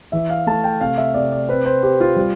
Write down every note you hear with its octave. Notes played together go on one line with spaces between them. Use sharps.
E3 E5
F5
A3 A5
G5
C3 F5
E5
C3 D5
D5
C4 B4
C5
C4 G4
F4
G3